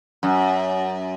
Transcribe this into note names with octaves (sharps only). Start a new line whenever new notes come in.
F#2